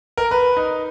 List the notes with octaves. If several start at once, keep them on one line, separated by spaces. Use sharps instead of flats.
A#4
B4
D#4